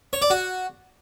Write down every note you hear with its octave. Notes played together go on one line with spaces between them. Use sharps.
C#5
D5
F#4